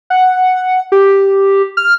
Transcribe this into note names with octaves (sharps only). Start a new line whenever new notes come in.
F#5
G4
F6